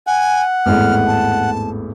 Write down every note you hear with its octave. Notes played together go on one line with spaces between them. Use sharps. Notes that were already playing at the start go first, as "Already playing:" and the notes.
F#5 G#5
G#1 E2 A2 F6
A5